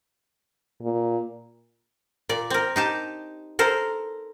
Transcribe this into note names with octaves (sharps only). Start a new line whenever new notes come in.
A#2
A#2 D5
C4 A#4
D#4 G4 A5
A4 A#4 C5